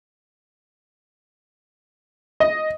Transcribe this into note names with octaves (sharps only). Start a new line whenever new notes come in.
D#5